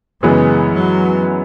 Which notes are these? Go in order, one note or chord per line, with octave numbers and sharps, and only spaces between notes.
F#2 C#3 E3 G#3 B3
F#3